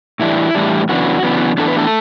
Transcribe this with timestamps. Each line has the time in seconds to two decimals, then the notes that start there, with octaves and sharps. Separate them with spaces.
0.19 A2 E3 G3 D4 E4
0.55 A2 E3 G3 D4
0.89 F#2 C#3 E3 B3 D4 F#4
1.23 F#2 C#3 E3 B3 D4
1.58 A2 E3 B3 D4 A4
1.68 B4
1.77 A3 A4